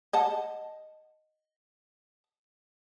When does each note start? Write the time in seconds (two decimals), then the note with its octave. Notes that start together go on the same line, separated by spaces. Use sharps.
0.13 D#5 F#5 A5